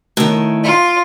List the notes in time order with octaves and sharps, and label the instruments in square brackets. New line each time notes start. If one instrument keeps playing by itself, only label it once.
[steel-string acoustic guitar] A2 D#3
[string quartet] F4